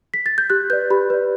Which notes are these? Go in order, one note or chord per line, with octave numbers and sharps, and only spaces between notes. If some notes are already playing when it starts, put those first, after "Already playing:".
B6
A6
G6
G4 F#6
B4 D5 G6
G4 B5
B4 D5